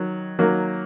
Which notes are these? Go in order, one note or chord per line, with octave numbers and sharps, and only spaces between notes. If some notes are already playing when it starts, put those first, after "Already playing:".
Already playing: D#3 F#3
D#3 F#3 A#3